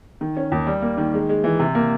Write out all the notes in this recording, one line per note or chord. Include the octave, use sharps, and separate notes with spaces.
D#3
C#4
D#2
G3
A#3
D#3
G#3
G#3
E3
C3
A#3